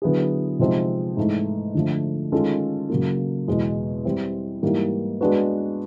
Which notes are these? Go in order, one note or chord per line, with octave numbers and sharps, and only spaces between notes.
D3 F#3 B3 E4 G#4
C3 F3 G#3 C4 D#4
G#2 E3 A3
D3 F3 A3
D#3 G#3 C#4 F4 A4
C#3 F#3 A#3
E2 B2 G#3
G3 C4 E4
G#2 E3 G3 A#3
G#3 B3 D4 F#4 B4